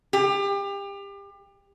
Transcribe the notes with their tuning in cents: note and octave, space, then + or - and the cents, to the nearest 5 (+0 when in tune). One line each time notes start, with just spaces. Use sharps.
G4 +30